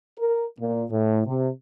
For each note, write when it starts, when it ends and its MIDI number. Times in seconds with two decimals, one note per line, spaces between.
0.18 0.43 70
0.59 0.84 46
0.90 1.22 45
1.26 1.49 48